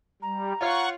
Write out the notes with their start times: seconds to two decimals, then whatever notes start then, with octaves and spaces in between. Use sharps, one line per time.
0.22 G3 A#5
0.61 F4 C#5 F5 F#5 C#6